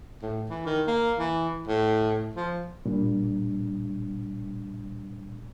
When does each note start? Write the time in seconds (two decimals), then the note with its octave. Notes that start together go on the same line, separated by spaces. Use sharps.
0.22 A2
0.49 E3
0.66 D#3
0.87 A#3
1.18 E3
1.68 A2
2.35 F3
2.85 A#2 G3 D4